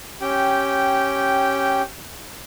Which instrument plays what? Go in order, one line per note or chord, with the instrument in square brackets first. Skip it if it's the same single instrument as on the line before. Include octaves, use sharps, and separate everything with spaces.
[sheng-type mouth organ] C#4 G4 G5